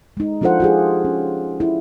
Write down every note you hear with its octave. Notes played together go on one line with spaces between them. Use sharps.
G#3 D#4
F3 D4 F4 A4 C5 F#5
F4 G4 G#4
C#4
E4